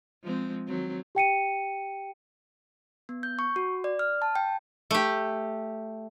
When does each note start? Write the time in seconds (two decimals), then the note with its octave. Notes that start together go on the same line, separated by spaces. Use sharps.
0.23 F3 G#3 C4
0.67 D#3 F#3 C4
1.15 G4 G5 C#7 D#7
3.09 B3
3.23 G6
3.39 C#6
3.56 F#4
3.84 D5
3.99 F6
4.22 A5
4.35 G5
4.91 A3 G4